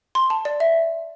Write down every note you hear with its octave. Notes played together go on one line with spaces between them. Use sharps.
C6
A5
D5
E5